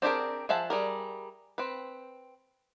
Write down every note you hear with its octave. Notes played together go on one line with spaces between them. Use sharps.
C4 D4 G4 G#4 A#4
F3 G#4 E5 F#5 A5
G3 G#4 A#4
C4 B4